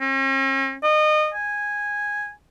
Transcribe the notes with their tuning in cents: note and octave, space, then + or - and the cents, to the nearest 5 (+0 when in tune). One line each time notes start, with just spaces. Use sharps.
C#4 -45
D#5 -30
G#5 -5